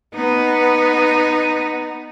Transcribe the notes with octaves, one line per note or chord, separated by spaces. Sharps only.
B3 D#4